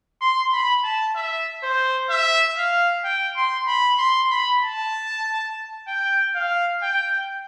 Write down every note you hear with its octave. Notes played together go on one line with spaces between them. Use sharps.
C6
B5
A5
E5
C5
E5
F5
G5
C6
B5
C6
B5
A5
G5
F5
G5